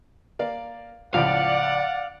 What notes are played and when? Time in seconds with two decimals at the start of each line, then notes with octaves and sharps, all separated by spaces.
0.39 A#3 D5 F5
1.14 C#2 A2 F3 D5 F5 F#5